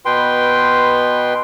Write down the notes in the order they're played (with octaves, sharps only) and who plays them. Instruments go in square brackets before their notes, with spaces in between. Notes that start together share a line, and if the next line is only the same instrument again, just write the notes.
[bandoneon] B2 B4 G5 C6